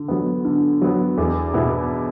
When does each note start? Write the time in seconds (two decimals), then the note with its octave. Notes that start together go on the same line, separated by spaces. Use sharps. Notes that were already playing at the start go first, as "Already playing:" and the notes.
Already playing: D3
0.08 F#3 B3
0.45 D3
0.82 F#3 B3
1.18 E2
1.54 B2 B3 E4